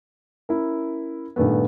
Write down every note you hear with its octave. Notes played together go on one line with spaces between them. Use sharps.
C#4 E4 A#4
G2 A#2 D#3 A3 B3